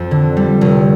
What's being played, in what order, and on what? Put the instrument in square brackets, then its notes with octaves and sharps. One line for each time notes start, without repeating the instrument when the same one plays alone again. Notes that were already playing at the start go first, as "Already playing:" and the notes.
Already playing: [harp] F2
D3
G3
F1